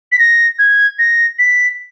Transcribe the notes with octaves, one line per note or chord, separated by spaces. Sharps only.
B6
A#6
G#6
A#6
B6